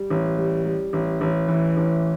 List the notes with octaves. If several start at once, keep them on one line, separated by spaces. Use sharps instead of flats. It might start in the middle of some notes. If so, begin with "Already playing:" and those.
Already playing: G3
A1
G3
G3
A1
A1
E3
A1